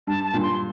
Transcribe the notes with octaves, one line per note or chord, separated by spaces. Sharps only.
G2 A5
A5
G2 A#2
C6